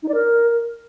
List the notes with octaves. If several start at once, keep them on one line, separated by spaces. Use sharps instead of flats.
D#4
D5
A#4